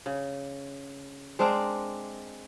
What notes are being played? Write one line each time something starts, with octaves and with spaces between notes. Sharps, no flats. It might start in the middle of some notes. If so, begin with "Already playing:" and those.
C#3
G#3 C4 D4 A#4